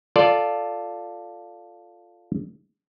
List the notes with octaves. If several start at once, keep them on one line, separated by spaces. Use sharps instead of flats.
F4 A4 D5